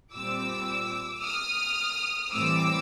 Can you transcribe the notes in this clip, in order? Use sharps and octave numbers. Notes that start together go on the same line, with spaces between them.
A#2 G3 C4 D6 E6
D#6 F6
A2 E3 G3 C4 D6 E6